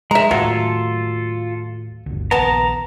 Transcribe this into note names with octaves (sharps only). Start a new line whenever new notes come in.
G#3 E5 A#5
D#2 A2 F#3 F4 A4
G1 D2
A#1 D#2 B3 A5 A#5